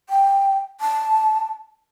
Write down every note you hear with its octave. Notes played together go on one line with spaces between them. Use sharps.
G5
A5